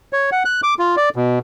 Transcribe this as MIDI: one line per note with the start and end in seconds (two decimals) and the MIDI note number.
0.13 0.30 73
0.32 0.43 78
0.45 0.61 90
0.63 0.74 86
0.79 0.96 65
0.97 1.09 74
1.16 1.39 47